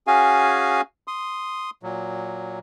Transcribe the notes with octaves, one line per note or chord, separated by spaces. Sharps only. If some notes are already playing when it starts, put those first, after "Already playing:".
C#4 F#4 G#4 F5 G#5
C6 D#6
A#2 F#3